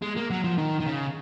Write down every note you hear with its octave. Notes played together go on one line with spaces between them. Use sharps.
G#3
A#3
F#3
F3
D#3
D#3
C#3